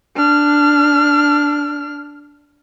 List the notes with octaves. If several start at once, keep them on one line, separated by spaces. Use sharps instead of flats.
D4 F6